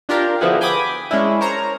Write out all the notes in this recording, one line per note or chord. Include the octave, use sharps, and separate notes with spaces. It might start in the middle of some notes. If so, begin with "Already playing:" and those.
D4 F4 G4 A#4
D3 F3 B3 E4 F#4 G#4
G5 G#5 B5 D6 D#6
G#3 C#4 D4 E4
A#4 C5 C#5 A#5